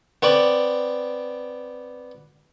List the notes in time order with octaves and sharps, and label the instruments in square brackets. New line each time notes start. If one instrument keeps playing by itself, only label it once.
[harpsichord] B3 C4 D5